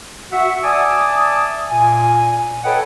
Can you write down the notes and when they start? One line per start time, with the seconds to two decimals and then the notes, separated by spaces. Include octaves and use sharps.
0.32 F#4 E5 F#5
0.64 D5 E5 G#5 A5 D6 D#6
1.71 A#2 G#5
2.64 A4 B4 C#5 D#5 F#5 G5